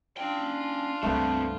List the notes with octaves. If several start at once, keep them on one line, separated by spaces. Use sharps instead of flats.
C#4 D4 F4 G5
C#2 G2 A3 B3 C4 A4